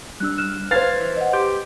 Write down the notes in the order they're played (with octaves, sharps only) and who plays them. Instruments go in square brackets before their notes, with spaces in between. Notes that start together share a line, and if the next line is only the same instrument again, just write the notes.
[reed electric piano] G3 D4 [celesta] E6 F#6
[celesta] F6 F#6 E7
[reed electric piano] B4 [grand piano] C5 G#6 A6 [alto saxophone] F5
[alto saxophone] E3
[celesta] D#5 F#5
[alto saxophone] G4 [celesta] C6